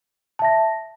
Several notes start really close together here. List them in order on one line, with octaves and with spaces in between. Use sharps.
A5 E5 A#6